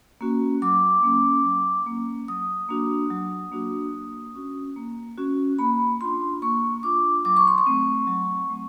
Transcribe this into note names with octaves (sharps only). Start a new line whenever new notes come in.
A#3 C#4 F#4
F#3 D6
A#3 C#4
F#3
A#3 C#4
F#3 D#6
A#3 D4 F#4
F#3
A#3 D4 F#4
A#3
C#4 F#4
A#3
C#4 F#4
A#3 B5
D4 F4 C6
A#3 C#6
D4 F4 D6
F#3 D6
C#6
C6
C#6
A3 C4
F#3
A3 C4